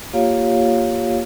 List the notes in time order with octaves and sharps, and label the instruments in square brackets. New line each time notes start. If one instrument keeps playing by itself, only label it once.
[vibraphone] A#3 F4 G4 C#5 F5